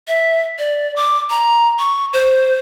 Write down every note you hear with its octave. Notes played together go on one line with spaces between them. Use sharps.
E5
D5
D6
A#5
C#6
C5